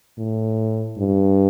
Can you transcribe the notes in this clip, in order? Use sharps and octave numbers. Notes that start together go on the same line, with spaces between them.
A2
G2